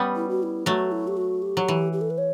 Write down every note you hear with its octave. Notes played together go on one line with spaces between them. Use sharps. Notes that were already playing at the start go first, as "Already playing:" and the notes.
Already playing: G3 B3 C#4
E4
F#4
E4
F#3 A3 F#4
E4
G4
F#4
G4
F#3
E3
G4
A4
B4
C#5